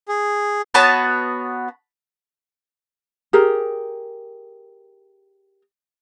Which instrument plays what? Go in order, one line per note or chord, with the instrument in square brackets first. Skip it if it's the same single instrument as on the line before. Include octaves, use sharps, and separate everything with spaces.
[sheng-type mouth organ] G#4
[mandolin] B3 F#4 C#5 A5
[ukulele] G4 G#4 A#4